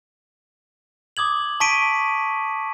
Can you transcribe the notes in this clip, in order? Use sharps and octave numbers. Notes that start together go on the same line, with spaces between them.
D6 D#6 G#6 F#7
A5 C#6 B6 D7 D#7